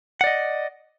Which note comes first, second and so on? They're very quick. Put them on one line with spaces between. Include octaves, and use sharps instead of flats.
F#5 D5 D#5